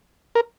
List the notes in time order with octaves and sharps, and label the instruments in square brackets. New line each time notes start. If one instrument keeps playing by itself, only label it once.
[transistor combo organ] A#4